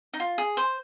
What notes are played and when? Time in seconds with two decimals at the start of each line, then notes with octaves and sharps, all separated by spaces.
0.13 D#4
0.20 F4
0.38 G#4
0.57 C5